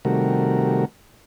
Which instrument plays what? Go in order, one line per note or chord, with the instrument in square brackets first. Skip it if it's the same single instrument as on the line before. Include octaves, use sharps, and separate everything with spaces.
[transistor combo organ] C3 D#3 G3 A3 F#4 A#4